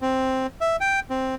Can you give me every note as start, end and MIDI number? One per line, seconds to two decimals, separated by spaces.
0.02 0.47 60
0.61 0.76 76
0.81 1.00 79
1.10 1.35 60